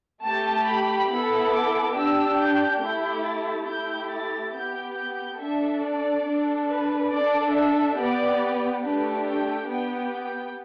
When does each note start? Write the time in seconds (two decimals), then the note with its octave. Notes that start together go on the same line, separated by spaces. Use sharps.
0.22 A3 G4 A5
0.65 B5
1.08 B3 E4 A4 B5
1.52 D6
1.95 D4 G4 E6
2.37 G6
2.81 A3 E4 G4 G6
3.24 A6
3.67 A3 E4 G4 G6
4.09 A6
4.52 B3 G4 G6
4.96 G6
5.39 D4 A4 E5
5.82 D5
6.24 D4 A4
6.68 B4
7.10 D4 A4 D5
7.53 E5
7.97 B3 G4 D5
8.82 A3 D4 G4 B4
9.26 G5
9.69 B3 G4 G5
10.12 G5